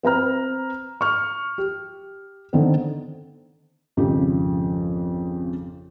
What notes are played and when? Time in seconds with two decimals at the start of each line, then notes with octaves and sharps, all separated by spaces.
0.03 C4 B4 A#5 F6
1.01 C#6 F6
1.58 G4
2.53 D3 D#3 A3 B3 C4
3.97 G#1 F2 C#3 F3 G4